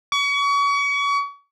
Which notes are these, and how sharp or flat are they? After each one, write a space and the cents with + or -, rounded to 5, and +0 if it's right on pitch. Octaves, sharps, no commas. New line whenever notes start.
C#6 +35